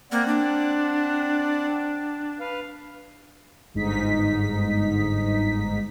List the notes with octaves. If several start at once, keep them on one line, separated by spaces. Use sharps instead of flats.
A#3 C4 D5 F#5
D4
B4 F5
G1 G#2 D#4 B6